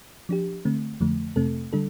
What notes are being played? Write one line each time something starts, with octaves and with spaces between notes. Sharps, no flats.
F3 D4 G4
D3 A3 C4
F2 D3 F3 A3
F2 C3 A3 C4 A4
D3 G3 D4 A4